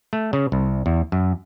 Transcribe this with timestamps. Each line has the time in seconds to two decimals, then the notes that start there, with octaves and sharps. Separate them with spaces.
0.13 A3
0.33 C#3
0.52 C2
0.86 E2
1.12 F#2